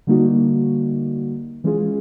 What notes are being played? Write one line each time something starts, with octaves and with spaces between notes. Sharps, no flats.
D3 G3 A#3 D#4 F#4
E3 G#3 C#4 F4 G#4